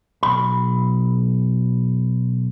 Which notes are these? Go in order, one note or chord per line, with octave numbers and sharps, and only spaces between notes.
B1 B5